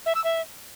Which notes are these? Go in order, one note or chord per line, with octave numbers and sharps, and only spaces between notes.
E5
E6
E5